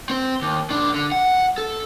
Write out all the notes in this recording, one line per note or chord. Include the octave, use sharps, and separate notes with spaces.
C4 C5
D#2
A#2 D4
D3
F#5
A4